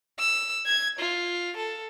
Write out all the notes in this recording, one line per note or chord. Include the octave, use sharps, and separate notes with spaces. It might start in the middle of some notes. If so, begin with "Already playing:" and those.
E6
G#6
F4
A4